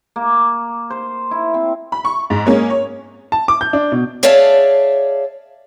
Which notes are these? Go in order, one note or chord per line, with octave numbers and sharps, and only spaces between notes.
A#3
C5
E4
C4
B5
C#6
G#2
G#3 A#3 C#4
C#5
A5
D6
G6
D4
B2
G#4 C#5 D5 E5 F5 A5